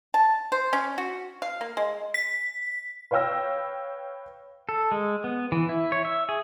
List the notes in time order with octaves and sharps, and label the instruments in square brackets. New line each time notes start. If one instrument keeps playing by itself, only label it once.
[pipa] A5
C5
C#4
F#4
F5
A#3
G#3
[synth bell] B6
[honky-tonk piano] B4 C#5 F5 G5 E6 A#6
[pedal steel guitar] A4
G#3
B3
E3
E4
C#5
E5
G#4